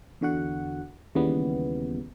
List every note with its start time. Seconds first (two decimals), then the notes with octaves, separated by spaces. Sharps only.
0.21 E2 D3 F#4 F#5
1.15 D#2 C#3 E3 G3 B3